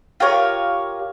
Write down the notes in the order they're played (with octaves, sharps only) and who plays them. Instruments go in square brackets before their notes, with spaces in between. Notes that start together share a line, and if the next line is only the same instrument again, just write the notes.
[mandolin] F4 G4 A#4 C#5